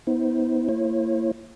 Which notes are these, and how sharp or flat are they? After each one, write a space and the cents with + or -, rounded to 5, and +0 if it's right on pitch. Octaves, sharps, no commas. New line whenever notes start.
B3 +0 E4 -40 C5 +0
A#3 -25 E4 +25 C#5 -40